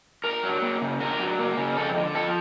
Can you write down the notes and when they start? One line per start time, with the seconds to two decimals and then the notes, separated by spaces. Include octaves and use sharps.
0.24 D4 A#4
0.43 F#3
0.62 A#3
0.82 C#3
1.00 D4 A#4
1.20 F#3
1.39 A#3
1.57 C#3
1.77 F2 A4
1.97 D3
2.15 F3 A4